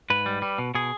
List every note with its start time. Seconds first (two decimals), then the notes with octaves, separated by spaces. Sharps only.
0.10 G#2 B4
0.26 G3
0.42 G3
0.58 B2
0.75 B2 G#4